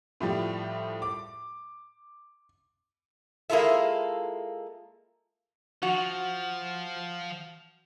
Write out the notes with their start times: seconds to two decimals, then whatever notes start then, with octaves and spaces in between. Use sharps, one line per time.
0.20 A2 F3 G3
1.02 D6
3.50 G#3 A#3 E4 F4 A4 E5
5.83 F3 F#4